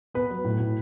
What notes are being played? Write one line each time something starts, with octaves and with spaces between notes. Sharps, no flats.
B3 B4
F#3
A2
A2